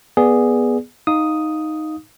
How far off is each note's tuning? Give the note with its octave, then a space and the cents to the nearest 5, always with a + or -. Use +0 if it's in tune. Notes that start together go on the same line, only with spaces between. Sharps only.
B3 -15 G#4 +0 D5 +0
D#4 +0 F5 +10 D#6 +0